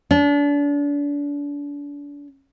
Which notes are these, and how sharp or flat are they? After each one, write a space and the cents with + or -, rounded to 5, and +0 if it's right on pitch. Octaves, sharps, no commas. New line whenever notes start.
D4 -35